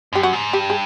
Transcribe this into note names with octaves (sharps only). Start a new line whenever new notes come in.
F#2 G4
F#4
G#2
G2 G4
G#4